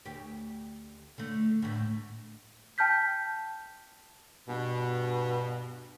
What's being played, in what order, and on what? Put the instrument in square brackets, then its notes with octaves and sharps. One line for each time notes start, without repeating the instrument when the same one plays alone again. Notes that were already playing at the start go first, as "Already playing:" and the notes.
[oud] D2 G4
D3 A3
D2 A2
[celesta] G5 A5 F6 G6 B6
[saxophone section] G2 B2